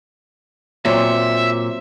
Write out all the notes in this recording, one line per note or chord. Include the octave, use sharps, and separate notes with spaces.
A#2 F#3 C4 E5